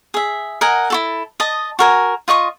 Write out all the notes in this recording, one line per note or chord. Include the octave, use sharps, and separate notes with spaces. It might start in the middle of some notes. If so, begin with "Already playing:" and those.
G#4 E5
A#4 D#5 F#5 G#5
E4 F#4 A4
D#5 A5 D#6
F#4 A#4 G#5
F4 D#5 C#6 D#6